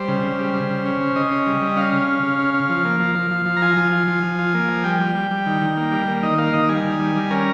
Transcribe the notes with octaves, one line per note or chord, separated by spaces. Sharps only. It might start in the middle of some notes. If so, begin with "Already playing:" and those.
Already playing: G3 C5
C#3
C#3
G3
G3
C#3
C#4
C#3
C#3 D#5
C#4
G3
G3
C#4 F5
C#3
C#4
C#3
C#4
C#4
F3
A#3
F3
F3
F3
F3
A#5
F4 G#5
F3
F4
F3
F3
F4
A#3
F3
G3 G5
G3
G3
G3
D#3
D#3
A#3
G3
A#3
D#3 D#5
A#3 F5
D#3 D#5
G3 G#5
D#3
G3
G3
C#4 A#4